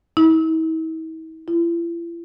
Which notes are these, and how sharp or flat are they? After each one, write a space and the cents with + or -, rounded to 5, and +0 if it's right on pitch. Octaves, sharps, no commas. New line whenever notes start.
E4 -45
E4 +45